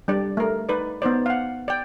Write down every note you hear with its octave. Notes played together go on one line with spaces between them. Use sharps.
G3 D4 D5
A3 A#4
D#4 B4 D5
B3 D#4 C5 D5
F5 F#5
D5 G5